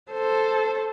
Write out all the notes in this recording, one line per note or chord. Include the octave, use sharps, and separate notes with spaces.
A4 C5